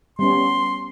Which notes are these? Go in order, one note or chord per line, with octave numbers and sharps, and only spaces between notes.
G3 B3 C#4 C6